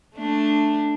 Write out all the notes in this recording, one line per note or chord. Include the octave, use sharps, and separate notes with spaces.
A3 D4